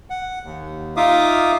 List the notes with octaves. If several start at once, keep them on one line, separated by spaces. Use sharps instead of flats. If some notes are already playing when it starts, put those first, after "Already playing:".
F#5
D#2
D#4 F4 E5 F5 D6 D#6